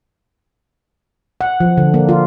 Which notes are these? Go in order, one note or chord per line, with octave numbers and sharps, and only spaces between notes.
F#5
F3
D3
A#3
F4